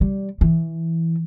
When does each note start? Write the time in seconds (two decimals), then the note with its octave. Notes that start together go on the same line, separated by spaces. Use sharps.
0.01 G3
0.41 E3